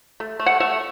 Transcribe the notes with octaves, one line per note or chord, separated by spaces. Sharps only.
A3
A3
F#5
A3 E5